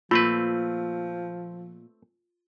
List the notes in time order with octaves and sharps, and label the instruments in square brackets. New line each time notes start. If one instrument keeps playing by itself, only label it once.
[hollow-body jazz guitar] A#2 [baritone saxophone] F3 [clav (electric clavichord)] A3 C4 B4 [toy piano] F4